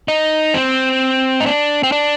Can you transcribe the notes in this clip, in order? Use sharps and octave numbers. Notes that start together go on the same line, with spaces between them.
D#4
C4
D#4
D4
C4
D4